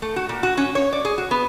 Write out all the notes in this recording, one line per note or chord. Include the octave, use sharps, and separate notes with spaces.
A3
F#4
A#2
F#4
C#4
C#5
D5
G#4
F#4
B3